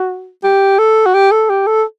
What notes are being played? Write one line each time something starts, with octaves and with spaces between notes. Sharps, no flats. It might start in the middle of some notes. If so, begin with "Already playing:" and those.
Already playing: F#4
G4
A4
F#4
G4
A4
G4
A4